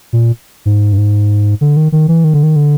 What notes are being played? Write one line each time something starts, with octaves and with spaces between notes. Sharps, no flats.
A#2
G#2
G2
G#2
D3
D#3
D#3
E3
D#3
D3
D#3
D3